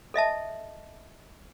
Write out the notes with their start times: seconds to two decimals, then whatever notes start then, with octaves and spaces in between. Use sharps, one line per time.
0.14 A4 D#5 E5 A5